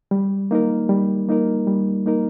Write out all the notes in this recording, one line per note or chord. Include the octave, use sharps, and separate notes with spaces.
G3
A#3 D#4 A#4
G3
A#3 D#4 A#4
G3
A#3 D#4 A#4